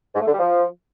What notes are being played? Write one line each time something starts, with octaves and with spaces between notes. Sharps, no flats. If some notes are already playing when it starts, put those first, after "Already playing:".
G#2
A3
D3
G3
F3